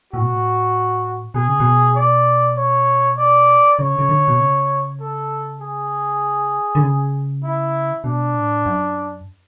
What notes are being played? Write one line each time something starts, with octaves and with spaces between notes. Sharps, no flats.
A2 F#4
B2
A2
B2 G#4
C#3
B2
D5
C#5
D5
C#3 C#5
C#3
D3
B2
C#3
A4
G#4
D3
C#3
E4
B2 D4
A2
F#2